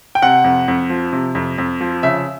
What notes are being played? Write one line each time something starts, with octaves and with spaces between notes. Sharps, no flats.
G5
C3 F#5
F2
F2
F3
C3
F2
F2
F3
C#3 E5